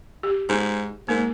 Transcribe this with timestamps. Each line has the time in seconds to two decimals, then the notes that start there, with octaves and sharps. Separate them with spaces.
0.23 G4
0.49 G#2 G#4
1.09 G#2 A#3 A#4